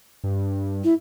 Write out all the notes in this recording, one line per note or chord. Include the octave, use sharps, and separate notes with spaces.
G2
E4